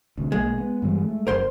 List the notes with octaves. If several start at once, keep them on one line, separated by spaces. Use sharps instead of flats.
D2 C3
B1 G#3 A#3
B3
G2 E3 G3
A3
F#1 F#2 A#4 C5 C6